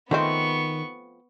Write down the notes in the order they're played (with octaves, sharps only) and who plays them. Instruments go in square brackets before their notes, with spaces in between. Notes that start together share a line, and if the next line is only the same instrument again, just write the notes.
[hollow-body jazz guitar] D#3 [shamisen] F3 A3 C4 [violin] B3 C#6